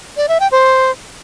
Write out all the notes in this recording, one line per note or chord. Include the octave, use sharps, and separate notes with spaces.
D5
E5
G5
C5